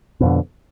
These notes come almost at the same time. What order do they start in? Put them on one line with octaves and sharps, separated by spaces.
B2 F2 D3